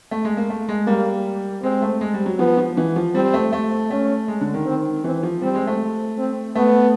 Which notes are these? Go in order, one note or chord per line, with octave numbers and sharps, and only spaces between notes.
A3
G#3
A#3
A3
G#3
G3 A#3
G#3 C4
A3
G#3
G3
F#3
F3 B3
F3
E3
F3
G3 C4
A3
A3
A3 C#4
G#3
D3
D#3
C4
E3 C4
F3
G3 C4
G#3
A3
C4
A3 B3